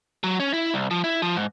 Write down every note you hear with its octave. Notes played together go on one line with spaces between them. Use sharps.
F#3
C#4
E4
C2
F3
E4
F3
G#2